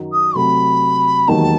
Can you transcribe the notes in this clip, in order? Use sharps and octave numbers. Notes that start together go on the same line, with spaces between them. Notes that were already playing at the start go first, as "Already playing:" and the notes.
Already playing: F#2 D#3 F#3
D#6
C3 F#3 A3 B5
E1 D#2 D#3 F#3 A5